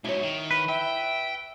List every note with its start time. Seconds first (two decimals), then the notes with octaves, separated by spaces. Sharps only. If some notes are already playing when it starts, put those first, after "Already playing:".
0.04 G#2 F#3 E4 C#5
0.23 D#3
0.51 B4
0.69 E5 G5